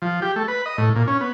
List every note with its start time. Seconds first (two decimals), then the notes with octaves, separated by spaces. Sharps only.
0.02 F3
0.22 G4
0.36 A3
0.48 B4
0.66 D#5
0.78 A2
0.96 A#2
1.07 C#4
1.21 B3